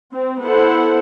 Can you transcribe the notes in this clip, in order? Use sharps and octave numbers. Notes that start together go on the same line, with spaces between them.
C4
B3 E4 A4 C5 F#5